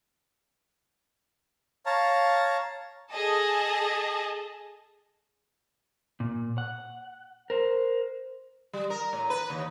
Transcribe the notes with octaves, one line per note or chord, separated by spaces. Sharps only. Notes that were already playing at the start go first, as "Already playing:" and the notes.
C#5 F5 A5 A#5
G#4 A4 D#5 A5
A#2
F#5
A#4 C5
G3
A#4
A2
B4
D#2